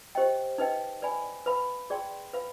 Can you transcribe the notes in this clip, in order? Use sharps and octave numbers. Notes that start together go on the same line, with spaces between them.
G4 C5 D#5 G5
D#4 B4 D#5 G5
B4 D5 G#5 B5
B4 F5 B5
G#4 D5 G5 C6
B4 F5 B5